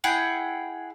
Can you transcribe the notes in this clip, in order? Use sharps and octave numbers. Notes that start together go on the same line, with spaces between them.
E4 G#4 F#5 G5